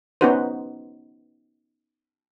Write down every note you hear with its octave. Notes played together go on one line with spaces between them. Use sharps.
B3 C#4 D#4 F#4 B4 C5